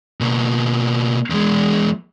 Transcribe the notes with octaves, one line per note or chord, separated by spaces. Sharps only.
B2 A#3
E2 G#3